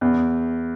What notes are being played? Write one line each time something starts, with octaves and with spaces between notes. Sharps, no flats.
E2